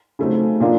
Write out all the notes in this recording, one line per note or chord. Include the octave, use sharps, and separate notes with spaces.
C#3 F#3 A3 C4 D#4
A#2 F3 A#3 D4 F4